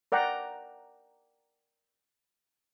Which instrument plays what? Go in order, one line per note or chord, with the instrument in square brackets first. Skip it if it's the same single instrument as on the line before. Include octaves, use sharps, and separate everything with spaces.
[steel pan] A#4 D5 F#5 G5 A#5